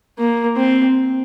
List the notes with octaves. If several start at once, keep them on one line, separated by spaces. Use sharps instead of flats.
A#3
C4